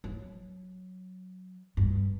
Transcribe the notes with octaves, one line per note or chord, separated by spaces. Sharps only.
F#3
G2